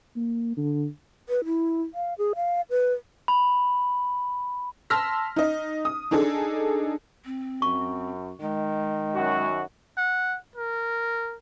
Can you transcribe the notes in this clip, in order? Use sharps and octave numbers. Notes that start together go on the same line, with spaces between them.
A#3
D3
B4
E4
F5
G#4
F5
B4
B5
A5 C6 E6 F6 A#6 B6
D#4 D#5
D#6
D4 D#4 G#4 A4
C4
F#2 C#6
D#3 G#3
F#2 F#4
F#5
A#4